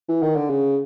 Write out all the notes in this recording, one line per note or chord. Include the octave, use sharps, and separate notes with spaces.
E3
D#3
D3
C#3